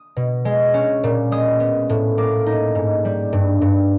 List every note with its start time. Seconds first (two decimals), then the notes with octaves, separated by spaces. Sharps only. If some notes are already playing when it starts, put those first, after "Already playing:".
Already playing: D#6
0.16 B2
0.45 G#3
0.74 C#4
1.04 A#2
1.32 G#3 D#6
1.60 B3
1.89 A2
2.18 A#3 D6
2.46 D#4
2.75 G#2
3.05 G3
3.33 G2
3.61 G2